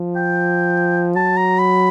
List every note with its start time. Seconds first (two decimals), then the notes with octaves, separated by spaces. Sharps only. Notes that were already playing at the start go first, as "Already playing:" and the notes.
Already playing: F3
0.16 G5
1.16 F#3 A5
1.37 A#5
1.59 B5